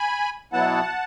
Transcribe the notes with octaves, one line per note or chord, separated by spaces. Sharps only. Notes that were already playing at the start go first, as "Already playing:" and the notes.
Already playing: G#5 B5
B2 F#3 B3 E4 F#5 A5